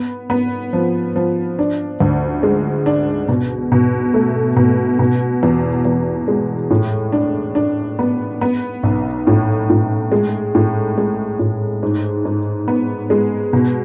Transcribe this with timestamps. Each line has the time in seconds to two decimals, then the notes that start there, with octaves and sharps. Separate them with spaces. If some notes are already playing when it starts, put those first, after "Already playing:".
Already playing: B3
0.30 B3
0.73 F3
1.16 F3
1.59 D4
2.00 D2
2.43 G#3
2.86 D4
3.28 B2
3.72 B2
4.14 A3
4.56 B2
4.99 B2
5.43 E2
5.85 E2
6.28 G#3
6.70 A2
7.12 D4
7.55 D4
7.99 B3
8.41 B3
8.83 B1
9.27 A2
9.70 A2
10.12 G#3
10.55 A2
10.98 G#3
11.39 A2
11.83 G#2
12.25 G#2
12.68 B3
13.10 G#3
13.53 B2